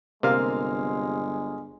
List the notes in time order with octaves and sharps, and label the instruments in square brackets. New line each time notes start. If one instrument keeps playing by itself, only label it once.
[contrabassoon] G1 [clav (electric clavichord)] C3 [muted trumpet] G#3 [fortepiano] A#3 F5